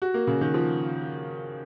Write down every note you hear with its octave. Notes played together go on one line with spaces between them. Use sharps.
F#4
A#3
C#3
D#3
F3